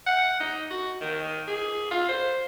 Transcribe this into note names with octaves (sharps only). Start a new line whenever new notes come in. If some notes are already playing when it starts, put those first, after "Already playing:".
F#5
D#4
F#4
D#3
G#4
F4
C5